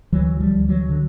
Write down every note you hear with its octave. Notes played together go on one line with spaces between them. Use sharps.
D2 E3 F#3
F3 G3
D2
E3 F#3
D3